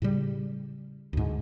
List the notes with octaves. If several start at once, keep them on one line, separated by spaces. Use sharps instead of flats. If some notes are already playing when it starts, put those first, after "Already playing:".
A2 C#3 G3
D2 G#2